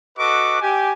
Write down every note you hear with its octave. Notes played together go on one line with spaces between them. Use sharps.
F#4 A4 B4 D#5 C#6 D6
G4 G#5